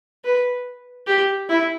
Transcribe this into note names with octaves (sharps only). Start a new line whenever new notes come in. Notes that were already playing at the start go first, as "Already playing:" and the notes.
B4
G4
E4